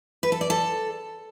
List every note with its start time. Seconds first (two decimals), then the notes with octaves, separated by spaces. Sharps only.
0.23 B4
0.32 A4
0.41 D5
0.50 A4